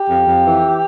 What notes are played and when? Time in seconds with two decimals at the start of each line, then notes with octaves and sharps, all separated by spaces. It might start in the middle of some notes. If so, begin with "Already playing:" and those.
Already playing: G4
0.10 F2
0.27 F2
0.46 E3